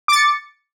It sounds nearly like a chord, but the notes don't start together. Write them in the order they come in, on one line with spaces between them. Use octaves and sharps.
D6 A6 C#7